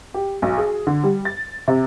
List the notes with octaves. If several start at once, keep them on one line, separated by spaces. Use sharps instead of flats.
G4
B1
G#4
D3
G3
A6
C3